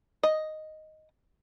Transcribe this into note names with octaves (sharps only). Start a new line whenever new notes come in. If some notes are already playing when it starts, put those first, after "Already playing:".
D#5